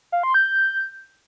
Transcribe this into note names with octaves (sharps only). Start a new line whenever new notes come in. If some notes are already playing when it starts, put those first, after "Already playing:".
F5
C6
G6